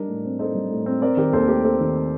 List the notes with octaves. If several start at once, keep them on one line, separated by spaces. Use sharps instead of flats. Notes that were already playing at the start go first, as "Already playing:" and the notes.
Already playing: G3 D4 D#4 A#4 D5
A2
C4
D#4 A4 C5
G3
A2
C4
C4 A#4 D5
D#3 G4 A#4
D#2 A4 C5
A3 G4 A#4
C4 A4
D#3